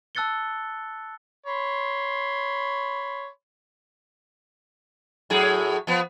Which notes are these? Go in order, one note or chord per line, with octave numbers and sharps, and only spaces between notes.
A5 E6 F#6 A6 C#7 G7
C#5 B5 C6
A2 F#3 G#4
F3 B3